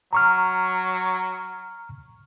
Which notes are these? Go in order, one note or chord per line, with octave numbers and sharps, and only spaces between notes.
F#3 A#5 C#6 F6